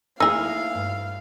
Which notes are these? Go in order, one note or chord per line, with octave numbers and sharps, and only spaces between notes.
A3 A#3 D#4 E4 G#4 F5 E6
G2